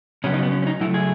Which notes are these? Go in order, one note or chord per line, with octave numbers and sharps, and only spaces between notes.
C#3 F#3 B3 C#4
D#4
B3
C#4
C#4
D#4
C#3 F#3 A3 E4
G#4